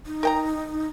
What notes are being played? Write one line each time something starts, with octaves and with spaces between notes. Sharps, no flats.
D#4
A#4 G5 A#5